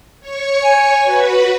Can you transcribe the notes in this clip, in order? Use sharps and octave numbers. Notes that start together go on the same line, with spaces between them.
C#5 C#6
G#5
F#4 B4